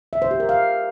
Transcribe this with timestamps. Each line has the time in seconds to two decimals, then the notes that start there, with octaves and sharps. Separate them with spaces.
0.13 E5
0.22 C5
0.31 G4
0.40 A#4
0.49 F5